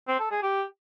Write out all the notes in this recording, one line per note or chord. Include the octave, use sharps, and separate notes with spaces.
C4
A4
G#4
G4